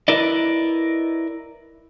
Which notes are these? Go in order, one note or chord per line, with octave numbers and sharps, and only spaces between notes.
E4 A#4 B4 D5 D#5